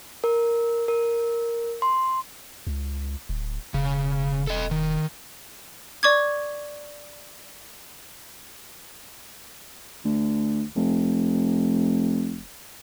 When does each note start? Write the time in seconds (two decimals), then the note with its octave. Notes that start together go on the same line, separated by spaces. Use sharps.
0.24 A#4
0.88 A#4
1.82 C6
2.67 C#2
3.29 D1
3.74 E1 C#3
4.47 A4 D#5
4.71 D#3
6.03 D5 C#6 D6 G#6
10.05 D2
10.76 F1